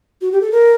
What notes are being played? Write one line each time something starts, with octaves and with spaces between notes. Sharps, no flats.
F#4
G4
A4
A#4